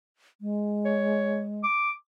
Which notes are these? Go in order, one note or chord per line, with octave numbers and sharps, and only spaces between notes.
G#3
C#5
D6